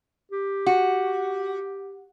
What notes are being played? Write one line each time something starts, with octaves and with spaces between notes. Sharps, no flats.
G4
F#4